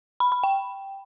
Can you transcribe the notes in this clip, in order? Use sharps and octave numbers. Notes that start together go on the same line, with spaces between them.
B5
B5
G5